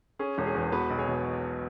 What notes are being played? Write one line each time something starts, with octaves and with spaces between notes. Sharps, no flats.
C#4 G#4
E1
G#4
E2
B3 F#4 B4
B1
G#4 C#5
B2